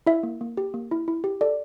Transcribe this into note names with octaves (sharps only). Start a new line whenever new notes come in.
E4 E5
A#3
A#3
G4
A#3
E4
E4
G4
A4 D5